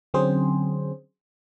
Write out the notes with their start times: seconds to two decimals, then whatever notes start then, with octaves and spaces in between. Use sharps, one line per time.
0.14 D3 F#3 C4 C#4 G#4 C5